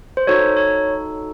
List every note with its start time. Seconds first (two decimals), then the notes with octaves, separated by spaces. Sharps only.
0.17 C5
0.27 D#4 F#4 A4 C#5
0.57 C#5